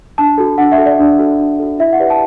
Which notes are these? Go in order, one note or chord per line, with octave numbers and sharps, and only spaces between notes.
D4 A5
F#4 A4
D4 F#5
E5
F#4 A4
D5
D4
F#4 A4
D4
F#4 A4
E4 E5
F#5
G4 B4 D5
A5